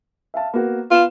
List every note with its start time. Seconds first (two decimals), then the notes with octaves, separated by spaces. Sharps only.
0.34 E5 F5 A5
0.54 A#3 B3 F#4
0.91 B3 F4 F5 E7